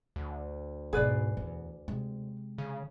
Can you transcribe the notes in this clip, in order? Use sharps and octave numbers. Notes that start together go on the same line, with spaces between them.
D2
G#2 B2 G#4 B4 D5
E2
C3 G#3
C#3